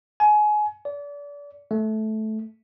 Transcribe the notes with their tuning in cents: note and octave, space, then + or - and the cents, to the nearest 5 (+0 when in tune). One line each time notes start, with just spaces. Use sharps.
G#5 +25
D5 -30
A3 -15